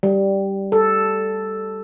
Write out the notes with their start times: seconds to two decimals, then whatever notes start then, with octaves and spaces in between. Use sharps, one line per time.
0.03 G3
0.72 A4